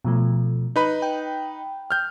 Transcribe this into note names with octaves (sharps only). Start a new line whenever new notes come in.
B2 F3 A3
D#4 B4 B5
G5
F6 G6